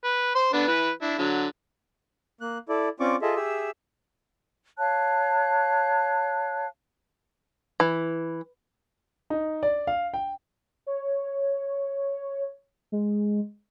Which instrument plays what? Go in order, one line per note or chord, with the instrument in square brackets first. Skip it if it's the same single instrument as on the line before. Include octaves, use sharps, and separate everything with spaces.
[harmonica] B4
C5 C6
D3 B3 D4
E3 B4
D4 E4
D3 F#3
[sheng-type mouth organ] A#3 F#6
E4 A4 D5
C4 C#4 F4 D5 C#6 D6
F4 G#4 A4 D#5 E5
G4 G#4 E5 E6
[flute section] C#5 F5 A5 F#6
[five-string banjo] E3
[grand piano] D#4
D5
F5
G5
[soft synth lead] C#5
G#3